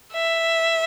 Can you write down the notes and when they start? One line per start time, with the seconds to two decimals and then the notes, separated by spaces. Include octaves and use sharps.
0.13 E5